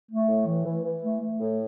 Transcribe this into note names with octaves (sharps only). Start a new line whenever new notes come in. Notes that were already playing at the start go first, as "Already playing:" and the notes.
A3
A2
E3
E3
E3
A3
A3
A2